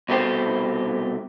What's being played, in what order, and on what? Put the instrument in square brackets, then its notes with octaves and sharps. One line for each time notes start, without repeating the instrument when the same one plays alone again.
[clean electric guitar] C2 B2 A3 G4 C5